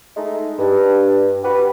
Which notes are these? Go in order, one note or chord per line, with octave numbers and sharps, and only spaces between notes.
G#3 A3 D#4
G2
F#4 G4 B4